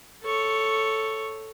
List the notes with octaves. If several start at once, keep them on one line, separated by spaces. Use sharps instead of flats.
A4 C#5